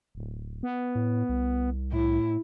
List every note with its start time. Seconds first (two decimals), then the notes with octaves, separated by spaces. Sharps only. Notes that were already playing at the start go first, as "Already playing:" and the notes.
0.15 D1
0.63 B3
0.95 A2
1.29 C2
1.93 A2 E4